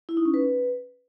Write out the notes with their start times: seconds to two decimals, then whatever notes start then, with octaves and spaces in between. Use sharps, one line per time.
0.09 E4
0.17 D#4
0.25 C#4
0.34 B4